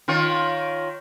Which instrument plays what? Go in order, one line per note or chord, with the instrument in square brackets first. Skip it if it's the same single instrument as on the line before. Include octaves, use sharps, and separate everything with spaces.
[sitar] D#3 F4 C#5